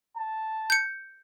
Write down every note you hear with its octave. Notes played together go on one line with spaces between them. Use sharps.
A5
G6 C#7